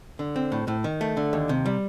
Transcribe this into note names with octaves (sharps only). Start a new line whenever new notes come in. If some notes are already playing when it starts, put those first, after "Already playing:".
D3
C4
A2
A2
D#3
A3
D3
D#2
C3
G3